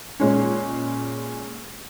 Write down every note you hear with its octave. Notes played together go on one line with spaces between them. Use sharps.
A#2 G#3 C#4